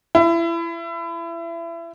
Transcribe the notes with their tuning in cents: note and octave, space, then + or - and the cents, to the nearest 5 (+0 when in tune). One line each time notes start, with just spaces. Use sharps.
E4 +30